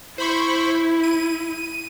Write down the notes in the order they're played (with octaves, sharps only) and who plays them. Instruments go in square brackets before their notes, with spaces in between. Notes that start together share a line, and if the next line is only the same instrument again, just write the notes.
[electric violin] E4 [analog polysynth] C5 B5 C#6
[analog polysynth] D#7